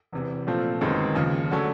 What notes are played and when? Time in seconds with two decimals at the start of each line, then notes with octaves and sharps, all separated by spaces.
0.13 E1 E2 C3 E3
0.47 A#2 F3 A3 C4 F4
0.81 G1 F#2 D#3 G#3 C4
1.15 D#2 C#3 F3
1.51 D3 F#3 A3 C#4